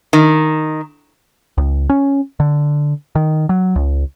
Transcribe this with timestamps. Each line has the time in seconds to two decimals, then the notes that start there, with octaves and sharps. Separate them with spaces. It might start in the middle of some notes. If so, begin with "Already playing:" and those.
0.13 D#3
1.58 C#2
1.90 C#4
2.40 D3
3.15 D#3
3.49 F#3
3.76 C#2